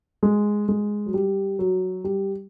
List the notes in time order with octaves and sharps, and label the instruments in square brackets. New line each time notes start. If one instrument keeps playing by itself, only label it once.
[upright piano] G#3
G#3
F#3
G3
F#3
G3